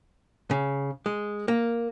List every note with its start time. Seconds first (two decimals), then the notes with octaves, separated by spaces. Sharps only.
0.51 C#3
1.06 G#3
1.48 A#3